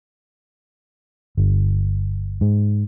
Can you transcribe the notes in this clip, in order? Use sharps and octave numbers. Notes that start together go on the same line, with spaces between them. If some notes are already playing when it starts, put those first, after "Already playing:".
G1
G#2